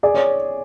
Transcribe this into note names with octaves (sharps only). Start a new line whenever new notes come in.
G#4 D5
C#5